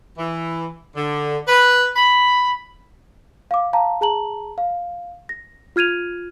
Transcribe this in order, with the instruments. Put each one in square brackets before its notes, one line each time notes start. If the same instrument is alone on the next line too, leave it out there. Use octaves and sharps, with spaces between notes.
[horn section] E3
D3
B4
B5
[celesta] F5 D6
F5 A5 A#5
G#4 A5 A#5 F#7
F5
A#6
F4 F6 G#6 D#7 F7